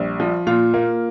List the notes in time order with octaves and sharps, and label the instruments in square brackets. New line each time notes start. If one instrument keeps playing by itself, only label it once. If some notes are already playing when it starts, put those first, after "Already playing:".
Already playing: [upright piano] A#1 G3
F3
[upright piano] A#2 [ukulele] F4
[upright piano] A#3